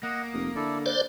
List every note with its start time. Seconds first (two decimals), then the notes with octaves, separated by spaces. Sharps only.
0.03 A#3 D#5 F#5
0.33 F1 D#6
0.55 D3 E4 A4 D5
0.86 D4 C5 D5